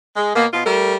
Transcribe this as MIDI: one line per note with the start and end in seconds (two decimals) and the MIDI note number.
0.16 0.34 56
0.35 0.46 47
0.35 0.46 58
0.53 0.64 47
0.53 0.64 65
0.66 0.95 55
0.66 0.95 57
0.66 0.95 70